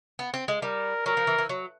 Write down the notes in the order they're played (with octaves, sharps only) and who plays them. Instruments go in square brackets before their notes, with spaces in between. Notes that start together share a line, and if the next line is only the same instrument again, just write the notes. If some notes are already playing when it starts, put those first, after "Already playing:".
[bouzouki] B3
C4
G#3
[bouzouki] G3 [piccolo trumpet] A#4
[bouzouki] F#3 [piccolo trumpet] A#4
[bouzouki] F3
E3
E3
F#3